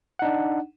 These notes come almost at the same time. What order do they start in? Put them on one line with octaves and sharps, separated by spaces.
F#5 D#4 D4